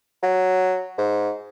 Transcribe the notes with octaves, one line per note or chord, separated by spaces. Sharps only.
F#3
G#2